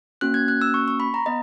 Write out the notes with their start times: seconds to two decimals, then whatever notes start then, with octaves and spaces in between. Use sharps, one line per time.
0.21 A#3 C#4 F#4 F#6
0.34 G#6
0.48 F#6
0.61 E6
0.74 C#6
0.88 C#6
1.00 B5
1.14 A#5
1.26 B3 D#5